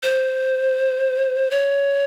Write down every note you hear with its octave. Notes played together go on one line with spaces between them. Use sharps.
C5
C#5